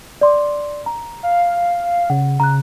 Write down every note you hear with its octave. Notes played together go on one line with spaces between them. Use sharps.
D5 C6 D6
A#5
F5
C#3 F#5
C#3 A#5 F#6